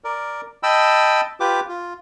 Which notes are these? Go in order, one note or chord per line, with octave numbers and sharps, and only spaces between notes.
A#4 D5
D#5 G5 A5 B5 E6
F4 G4 B4 D6
F4